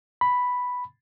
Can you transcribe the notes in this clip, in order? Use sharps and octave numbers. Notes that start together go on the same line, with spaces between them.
B5